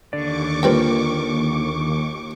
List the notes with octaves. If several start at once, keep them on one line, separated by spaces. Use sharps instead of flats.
D#2 D3 D5 C#6 D6
G2 A#3 C4 F4 A#4 B4